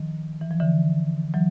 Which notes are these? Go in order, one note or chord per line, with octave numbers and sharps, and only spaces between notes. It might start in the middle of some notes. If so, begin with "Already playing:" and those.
Already playing: D#3 F3
E3
F3
D3 E3
E3 F#3